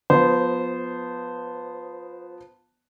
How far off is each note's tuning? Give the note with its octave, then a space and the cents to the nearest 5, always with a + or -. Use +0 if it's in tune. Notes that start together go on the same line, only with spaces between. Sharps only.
F3 +20 B3 +0 C5 -15